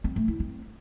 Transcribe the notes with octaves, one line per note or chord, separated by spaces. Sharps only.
C4
A3
E4
C4